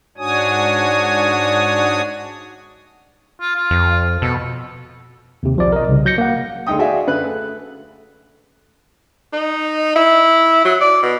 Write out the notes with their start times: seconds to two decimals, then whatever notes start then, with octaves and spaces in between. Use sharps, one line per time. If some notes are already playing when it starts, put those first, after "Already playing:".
0.18 G#2 D4 F#4 C#5 G#5 D#6
3.41 F4
3.56 F4
3.71 F2
4.22 B2 A4
5.43 D#2 C3
5.56 B1 F3 D5
5.72 A#4 D#5
5.89 C2 C#3
6.05 F#3 G6 A#6 C#7
6.18 A#3 F#5
6.67 D2 G#3 D#4 G5 D#6
6.79 F#4 G#4 D5 E5 F5 G#5
7.07 F#2 D3 B4 F#6
7.24 A3
9.33 D#4
9.96 E4
10.65 F#3
10.80 D5
11.03 B2